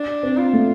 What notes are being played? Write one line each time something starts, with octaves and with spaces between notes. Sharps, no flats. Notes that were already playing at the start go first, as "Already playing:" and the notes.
Already playing: D4
C4
F4
A3